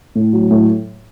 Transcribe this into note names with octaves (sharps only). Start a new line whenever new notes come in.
A2
F#3
A2